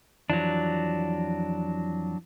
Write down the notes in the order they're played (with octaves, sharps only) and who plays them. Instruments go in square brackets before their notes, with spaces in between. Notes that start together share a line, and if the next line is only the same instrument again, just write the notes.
[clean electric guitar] F2 E3 F4 [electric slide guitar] F#3 D4